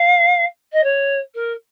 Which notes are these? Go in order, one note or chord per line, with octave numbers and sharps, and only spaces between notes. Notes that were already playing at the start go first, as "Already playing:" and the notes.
Already playing: F5
D#5
C#5
A#4